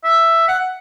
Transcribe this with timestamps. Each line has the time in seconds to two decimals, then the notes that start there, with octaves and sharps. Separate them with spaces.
0.04 E5
0.48 F#5